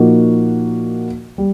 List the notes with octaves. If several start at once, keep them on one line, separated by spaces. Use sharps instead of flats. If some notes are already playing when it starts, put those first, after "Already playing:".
Already playing: A#2 F3 A#3 D#4 F#4
G3